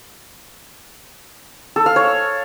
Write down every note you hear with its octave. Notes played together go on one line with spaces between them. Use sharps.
A4
F5
C#5